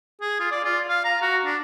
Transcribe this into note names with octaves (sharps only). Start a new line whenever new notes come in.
G#4
F4
D5
F4
F5
A#5
F#4
D4